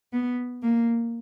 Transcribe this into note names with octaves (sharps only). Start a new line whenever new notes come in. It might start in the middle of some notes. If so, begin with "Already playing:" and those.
B3
A#3